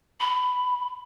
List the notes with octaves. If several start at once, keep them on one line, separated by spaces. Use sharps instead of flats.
B5